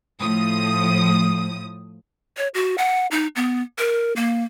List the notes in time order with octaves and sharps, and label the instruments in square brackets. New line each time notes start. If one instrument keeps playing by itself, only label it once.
[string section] A2 F3 D#6
[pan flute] C#5
F#4
F#5
D#4
B3
A#4
A#3